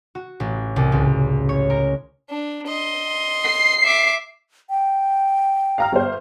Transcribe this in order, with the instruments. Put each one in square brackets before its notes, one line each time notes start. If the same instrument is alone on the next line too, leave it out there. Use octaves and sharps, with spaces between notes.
[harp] F#4
A1
C2
C#2
C#5
A#4
[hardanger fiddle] D4
D#5 C6
[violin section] C7
[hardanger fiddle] E5 D6
[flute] G5
[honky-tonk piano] F5 A#5 F6
G1 C5